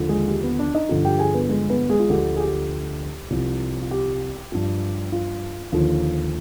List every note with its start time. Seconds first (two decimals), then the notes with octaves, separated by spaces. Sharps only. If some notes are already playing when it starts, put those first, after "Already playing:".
Already playing: D#2 D3 F3
0.09 G#3 G#4
0.28 G4
0.43 B3 B4
0.59 D4 D5
0.74 D#4 D#5
0.89 G2 D3 F3
1.05 G4 G5
1.19 G#4 G#5
1.34 B3 B4
1.49 G#3 G#4
1.70 B3 B4
1.90 G#3 G#4
1.99 F4
2.10 D2 D3 F3 G4
2.36 G#4
2.40 G4
3.31 C2 C3 F3
3.82 F4
3.91 G4
4.52 G2 F3
5.12 F4
5.72 D#2 D3 F3